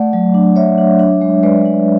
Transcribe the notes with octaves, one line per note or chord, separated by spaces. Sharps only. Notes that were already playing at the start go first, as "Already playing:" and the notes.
Already playing: A3 D5 F#5
F#3
D4
F#3 C#5 E5
D4
D4
G#3
G#3 B4 D5
D4